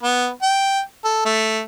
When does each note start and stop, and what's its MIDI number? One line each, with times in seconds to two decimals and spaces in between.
0.03 0.28 59
0.42 0.80 79
1.04 1.22 69
1.25 1.61 57